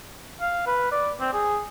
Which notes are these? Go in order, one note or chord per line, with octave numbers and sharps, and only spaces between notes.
F5
B4
D5
C4
G#4